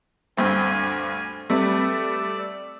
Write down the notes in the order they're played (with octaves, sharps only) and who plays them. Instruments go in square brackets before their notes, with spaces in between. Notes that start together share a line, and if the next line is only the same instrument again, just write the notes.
[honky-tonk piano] D2 G2 C4 [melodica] G#5
[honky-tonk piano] G3 A3 B4 [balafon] C4 [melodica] D5 E6